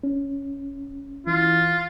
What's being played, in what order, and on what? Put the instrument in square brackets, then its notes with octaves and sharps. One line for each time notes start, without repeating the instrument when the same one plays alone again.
[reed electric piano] C#4
[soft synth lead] E3 [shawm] F4